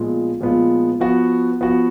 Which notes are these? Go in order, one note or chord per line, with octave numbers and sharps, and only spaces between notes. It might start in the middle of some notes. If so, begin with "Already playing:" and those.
Already playing: A#2 F3 G#3 B3 F4
A#2 F3 G#3 B3 F4
F3 B3 F#4
F3 B3 F#4